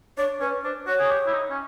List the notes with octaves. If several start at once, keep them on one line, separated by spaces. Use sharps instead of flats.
D4 C#5
C#4 B4
D4 C5
F#4 C#5
G#4
G4
E4
D#4
C#4